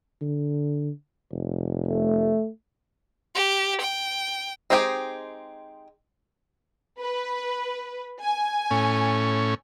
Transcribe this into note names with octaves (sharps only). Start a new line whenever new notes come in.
D3
F1
A3
G4
G5
G#3 C4 D#4 G4 G#4
B4
G#5
A2 C#4